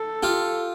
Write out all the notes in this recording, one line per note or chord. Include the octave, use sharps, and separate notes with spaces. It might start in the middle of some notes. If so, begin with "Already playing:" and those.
Already playing: A4
F4 G4